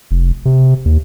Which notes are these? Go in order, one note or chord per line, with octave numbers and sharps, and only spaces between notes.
F1
C3
D#2